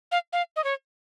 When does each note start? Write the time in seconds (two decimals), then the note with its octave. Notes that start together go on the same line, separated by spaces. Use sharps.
0.12 F5
0.33 F5
0.56 D#5
0.64 C#5